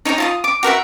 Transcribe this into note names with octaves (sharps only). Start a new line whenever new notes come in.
D#4 C#5 G#5 A#5
F4 A5 D#6
D6
F#4 A#4 B4 E5